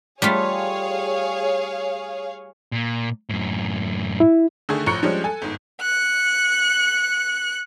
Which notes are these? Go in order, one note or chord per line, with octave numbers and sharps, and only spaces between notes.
G3 A3 F4 G#4 C#5 F5
A#2
F#2 A2
E4
D3 D#3 A3 G#4
A1 F3 A#5 C#6 F#6 C#7
F3 G3 G#3 C#4 D4
A4 G#5
G1 G#2
F#6 C#7